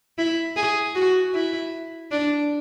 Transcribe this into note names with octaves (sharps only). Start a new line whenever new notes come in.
E4
G#4
F#4
E4
D4